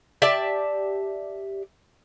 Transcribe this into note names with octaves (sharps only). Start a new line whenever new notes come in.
G4 D5 E5 A5